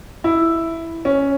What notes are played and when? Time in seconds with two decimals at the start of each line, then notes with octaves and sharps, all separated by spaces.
0.24 E4
1.05 C#4